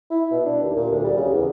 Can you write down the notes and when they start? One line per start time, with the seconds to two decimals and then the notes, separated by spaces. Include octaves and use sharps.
0.11 E4
0.31 B2
0.46 D4
0.63 D#2
0.76 A#2
0.92 D2
1.04 G3
1.17 C#3
1.33 E2